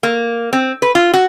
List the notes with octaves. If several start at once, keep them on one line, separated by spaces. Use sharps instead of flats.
A#3
C4
B4
F4
F#4